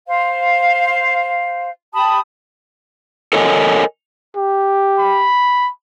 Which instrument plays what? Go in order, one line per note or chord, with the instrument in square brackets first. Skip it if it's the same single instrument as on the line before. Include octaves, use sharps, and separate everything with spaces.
[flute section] C5 F5
G4 A5 B5 D#6
[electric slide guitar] A4 A#4 C#5 D#5 F#5 G#5
[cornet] G4
[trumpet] B5